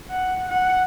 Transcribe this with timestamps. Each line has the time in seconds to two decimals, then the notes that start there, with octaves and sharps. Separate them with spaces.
0.10 F#5
0.49 F#5